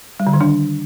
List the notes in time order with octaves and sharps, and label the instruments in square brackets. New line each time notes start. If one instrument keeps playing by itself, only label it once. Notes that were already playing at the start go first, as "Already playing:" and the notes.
[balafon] G3
D3
D#3
D4